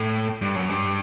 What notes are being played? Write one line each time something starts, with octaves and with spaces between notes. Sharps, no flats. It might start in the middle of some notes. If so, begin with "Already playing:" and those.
Already playing: A2
G2
F#2
G2